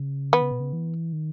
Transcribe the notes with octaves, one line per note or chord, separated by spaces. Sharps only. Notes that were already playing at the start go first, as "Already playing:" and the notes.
Already playing: C#3
D#3 B3
C#3
B2
C#3
E3
D#3